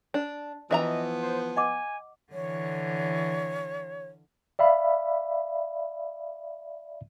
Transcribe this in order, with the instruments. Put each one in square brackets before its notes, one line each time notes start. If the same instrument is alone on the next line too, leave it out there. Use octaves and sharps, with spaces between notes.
[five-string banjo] D4
[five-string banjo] E3 E5 A#5 [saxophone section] F3 B3 [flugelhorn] D#5
[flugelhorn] C5
[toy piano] D#5 F#5 D6 [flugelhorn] G#5
[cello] D3 E3 [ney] C#5
[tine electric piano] D5 E5 F5 B5